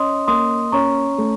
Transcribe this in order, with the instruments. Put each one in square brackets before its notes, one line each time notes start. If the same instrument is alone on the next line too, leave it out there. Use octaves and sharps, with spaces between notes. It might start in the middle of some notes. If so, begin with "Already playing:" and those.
Already playing: [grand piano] C#4 [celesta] D#5 C6 D#6
[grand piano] A#3 [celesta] C6 D#6
[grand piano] C#4 [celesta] A#5 C#6
[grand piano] A3